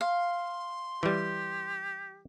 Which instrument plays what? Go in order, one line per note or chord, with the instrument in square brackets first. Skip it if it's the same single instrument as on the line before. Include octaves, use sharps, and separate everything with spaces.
[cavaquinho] F5 [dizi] C6
[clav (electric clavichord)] E3 G3 [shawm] G4